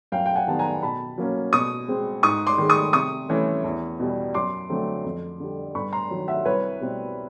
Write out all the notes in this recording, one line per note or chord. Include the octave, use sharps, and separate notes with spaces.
F#2 F5 G5
G5
F#5 G#5
D#3 G3 B3 A5
G#5 A#5
B2 A5 B5
F#3 A#3 C#4
B2 C#6 D#6
G#3 C4
G#2 C#6 D#6
C6 D6
D#3 G#3
C#6 D#6
C3 C#6 D#6
E3 A3 C#4
E2
B2 G3
F#2 C6 D6
D3 F#3 A3 C4
F2
D3 G3
G2 B5 C#6
A#5 C6
D#3 F#3
E5 F#5
C2 B4 C#5
B2 G3 C4